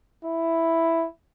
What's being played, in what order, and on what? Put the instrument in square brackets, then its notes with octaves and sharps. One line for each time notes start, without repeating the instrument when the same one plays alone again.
[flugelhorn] E4